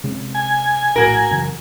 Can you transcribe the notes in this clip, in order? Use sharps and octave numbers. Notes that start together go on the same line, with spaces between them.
C3 G#3 C#4
G#5
A#1 A2 F#4 A#4
F#2 C#3 E3